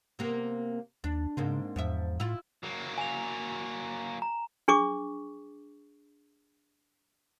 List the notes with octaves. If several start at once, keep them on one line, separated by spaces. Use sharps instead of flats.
C3 A#3 B3
D#2 D4
G#2 C#3 A#3 C4
E2 G#2 F3 E5
A2 E4 F4
F#3 A#3
G#5 F7
A#5
D4 G#4 C#6 D6